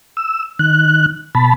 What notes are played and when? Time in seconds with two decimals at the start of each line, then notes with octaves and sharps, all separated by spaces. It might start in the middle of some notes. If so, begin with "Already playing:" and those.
0.17 E6
0.59 D#3 F#6
1.35 B2 A5 B5